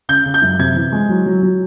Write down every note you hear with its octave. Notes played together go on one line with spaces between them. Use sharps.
C#3 G6
C#3
G6
F#2
C3 G#6
E3
G#3
F#3
F#3
F#3